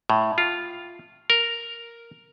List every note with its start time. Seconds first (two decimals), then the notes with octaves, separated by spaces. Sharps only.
0.10 A2
0.38 F4
1.30 A#4